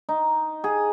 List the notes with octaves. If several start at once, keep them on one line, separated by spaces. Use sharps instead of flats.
D#4
G#4